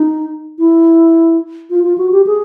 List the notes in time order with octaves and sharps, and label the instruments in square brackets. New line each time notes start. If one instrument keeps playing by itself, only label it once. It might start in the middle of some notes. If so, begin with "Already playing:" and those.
Already playing: [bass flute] D#4
E4
F4
F4
F#4
G4
G#4